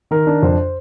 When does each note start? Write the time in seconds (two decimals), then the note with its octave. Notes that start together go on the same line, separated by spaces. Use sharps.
0.11 D#3 A#4
0.27 D4
0.42 F2 C5